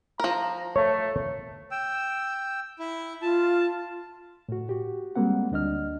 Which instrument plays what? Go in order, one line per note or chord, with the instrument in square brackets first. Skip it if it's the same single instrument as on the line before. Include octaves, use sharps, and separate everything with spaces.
[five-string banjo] F3 A#4 [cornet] A#5
[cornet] A3 [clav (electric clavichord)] C#5
[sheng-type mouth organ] G5 E6
E4
[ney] F4 [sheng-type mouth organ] A5
[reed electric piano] A2 F#4
F#4 G4
G3 G#3 A#3 C4 F#5
D2 D4 D#5 F6